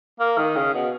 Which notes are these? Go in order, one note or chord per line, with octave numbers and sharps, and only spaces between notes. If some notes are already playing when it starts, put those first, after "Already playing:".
A#3
D#3
C#3
B2